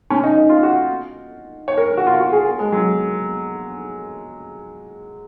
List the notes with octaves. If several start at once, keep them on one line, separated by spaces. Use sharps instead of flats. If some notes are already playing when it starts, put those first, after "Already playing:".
C#4
D#4
D#4
F4
F#4
C#5
A#4
A#4
F#4
F4
F#4
G#4
G#3
F#3